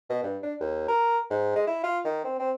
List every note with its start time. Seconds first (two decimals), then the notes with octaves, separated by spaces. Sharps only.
0.10 B2
0.23 G2
0.43 D4
0.60 D#2
0.88 A#4
1.30 G#2
1.56 G#3
1.67 E4
1.83 F4
2.05 D#3
2.24 C4
2.39 C4